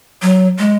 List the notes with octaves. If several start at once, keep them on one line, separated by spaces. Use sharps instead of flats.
F#3
G#3